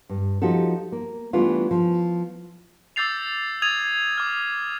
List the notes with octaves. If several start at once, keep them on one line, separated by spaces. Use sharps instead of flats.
G2
F3 D#4 F#4 G4 A4
A#3
E3 G3 A3 B3 D4 F4
F3
D6 E6 G6 A6 C7 F7
D#6 G#6 A6 D#7 F7
D6 F6